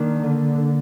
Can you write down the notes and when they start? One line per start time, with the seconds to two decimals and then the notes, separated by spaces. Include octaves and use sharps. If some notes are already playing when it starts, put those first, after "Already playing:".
Already playing: D#3 A#3 D4
0.23 D3